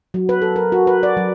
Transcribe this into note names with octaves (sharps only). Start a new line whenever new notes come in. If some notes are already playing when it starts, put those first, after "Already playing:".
F#3
B4
A4
A#4
F#4
B4
D5
F#3